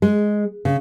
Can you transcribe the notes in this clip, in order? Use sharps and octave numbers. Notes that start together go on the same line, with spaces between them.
G#3
C#3